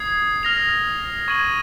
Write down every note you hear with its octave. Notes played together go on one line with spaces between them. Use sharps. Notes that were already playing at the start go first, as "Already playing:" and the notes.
Already playing: D#6 G#6 C7
F6 A#6 F7
C#6 G#6 D#7 F#7